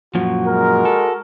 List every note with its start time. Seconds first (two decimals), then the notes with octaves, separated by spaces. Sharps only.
0.15 F#2 A#2 F3 F#4
0.47 G#3 A#4
0.85 A4